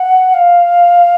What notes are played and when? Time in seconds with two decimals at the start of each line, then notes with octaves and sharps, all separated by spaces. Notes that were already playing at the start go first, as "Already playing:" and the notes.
Already playing: F#5
0.34 F5